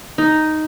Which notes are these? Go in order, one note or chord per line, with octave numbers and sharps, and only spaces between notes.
D#4